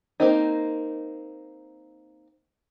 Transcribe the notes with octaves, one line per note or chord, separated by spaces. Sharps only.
A#3 C4 D#4